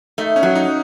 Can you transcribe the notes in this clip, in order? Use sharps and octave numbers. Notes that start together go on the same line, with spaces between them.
A3 D#4
C#4
F#3
D#4